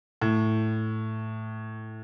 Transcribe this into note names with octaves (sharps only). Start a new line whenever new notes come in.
A2